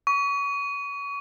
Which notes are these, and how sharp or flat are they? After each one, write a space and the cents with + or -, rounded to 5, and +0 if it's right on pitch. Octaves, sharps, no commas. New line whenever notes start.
C#6 +30